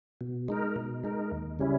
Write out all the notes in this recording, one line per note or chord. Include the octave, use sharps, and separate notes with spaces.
B2
G#3 D#4 A#4
B2
G#3 D#4 A#4
D#2
C#3 G3 C#4 E4